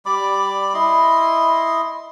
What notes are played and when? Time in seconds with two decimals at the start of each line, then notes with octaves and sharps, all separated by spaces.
0.06 G3 D5 B5 D6
0.74 E4 D#5 C6